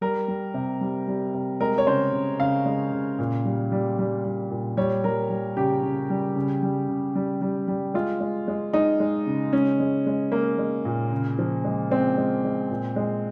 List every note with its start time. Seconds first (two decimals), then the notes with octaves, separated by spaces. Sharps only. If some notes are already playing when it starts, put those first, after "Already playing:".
0.01 G3 A#4
0.28 G3
0.54 C3
0.81 G3
1.08 G3
1.34 C3
1.60 G#3 A#4
1.78 C#5
1.87 C#3 C5
2.13 C#3
2.40 C#3 F5
2.66 G#3
2.92 C#3
3.19 A#2
3.45 G3
3.72 G3
3.99 G3
4.25 G3
4.51 A#2
4.77 G3 C#5
5.04 G3 A#4
5.30 G3
5.57 C#3 G4
5.83 C#3
6.10 G3
6.36 C#3
6.62 G3
6.88 C#3
7.15 G3
7.41 G3
7.68 G3
7.94 G#3 F4
8.20 G#3
8.48 G#3
8.73 G#3 D#4
9.00 G#3
9.27 C#3
9.53 G#3 C#4
9.80 G#3
10.06 G#3
10.32 G#3 A#3
10.59 G#3
10.85 A#2
11.11 C#3
11.39 F3
11.64 G#3
11.91 G#3 C4
12.17 G#3
12.44 G#3
12.70 A#2
12.96 G#3